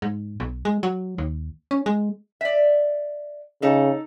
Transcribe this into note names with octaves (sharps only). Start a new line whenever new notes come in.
G#2
B1
G#3
F#3
D#2
C#4
G#3
D5 E5
C#3 D#4 A4